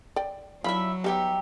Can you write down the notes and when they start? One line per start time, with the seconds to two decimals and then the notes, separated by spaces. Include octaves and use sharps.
0.16 D5 G5
0.64 F#3 D4 E4 F4 E5 B5
1.04 G3 G#3 B3 D#4 G4 E5